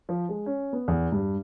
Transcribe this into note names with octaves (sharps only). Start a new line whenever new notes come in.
F3
G#3
C#4
B3
E2
G2